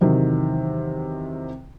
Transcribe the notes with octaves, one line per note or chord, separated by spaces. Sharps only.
E2 C3 D#3 F#3